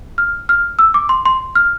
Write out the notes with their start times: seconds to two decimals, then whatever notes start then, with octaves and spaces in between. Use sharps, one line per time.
0.18 F6
0.49 F6
0.79 E6
0.94 D6
1.09 C6
1.26 C6
1.55 F6